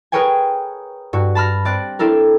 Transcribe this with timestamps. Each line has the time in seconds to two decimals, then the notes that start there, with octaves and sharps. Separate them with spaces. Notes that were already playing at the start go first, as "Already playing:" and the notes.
0.12 G#4 A#4 B4 C#5 G5 G#5
1.13 G2 F#4
1.35 A5 B5 F6 A#6
1.65 C4 D5 F#6
1.99 C4 D4 E4 A4 A#4